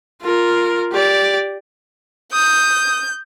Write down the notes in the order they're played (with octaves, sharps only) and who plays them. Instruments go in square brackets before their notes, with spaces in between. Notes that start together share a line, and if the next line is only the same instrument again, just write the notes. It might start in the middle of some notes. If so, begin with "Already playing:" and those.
[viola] F4 A#4
G4 D5
[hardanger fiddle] D#6 [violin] G6